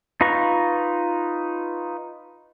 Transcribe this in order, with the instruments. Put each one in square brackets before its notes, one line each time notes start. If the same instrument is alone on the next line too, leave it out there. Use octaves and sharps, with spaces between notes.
[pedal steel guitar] D#4 F4 B4 A#5 C#6